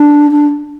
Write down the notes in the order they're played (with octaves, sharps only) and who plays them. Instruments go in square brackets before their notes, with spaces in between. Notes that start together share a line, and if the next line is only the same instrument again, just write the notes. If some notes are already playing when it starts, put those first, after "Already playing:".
Already playing: [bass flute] D4
D4